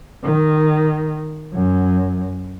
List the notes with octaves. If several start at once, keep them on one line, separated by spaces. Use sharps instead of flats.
D#3
F#2